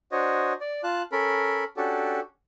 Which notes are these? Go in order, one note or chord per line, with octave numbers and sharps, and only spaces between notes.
D4 F#4 C5 C#5 D#5
D5
F4 A5 F#6
C#4 A4 A#4 B5
C#4 D4 F#4 G4 A4